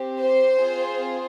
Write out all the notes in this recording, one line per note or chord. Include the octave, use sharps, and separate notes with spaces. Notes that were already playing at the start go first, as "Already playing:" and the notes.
Already playing: C4 G4
C5
C4 F4 G#4